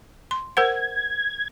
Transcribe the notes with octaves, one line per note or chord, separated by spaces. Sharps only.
C6
A#4 C5 F#5 G#6